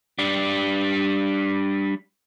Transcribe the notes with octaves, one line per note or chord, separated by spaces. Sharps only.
G3 D4